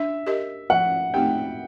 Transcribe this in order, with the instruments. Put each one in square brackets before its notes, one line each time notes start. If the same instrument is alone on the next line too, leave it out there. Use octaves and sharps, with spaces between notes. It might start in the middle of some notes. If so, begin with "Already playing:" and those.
Already playing: [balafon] D4 [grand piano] E5
[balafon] G4 A#4 D#5
[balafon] F3 [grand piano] F#5
[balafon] A3 C4 D#4 G4 [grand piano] G5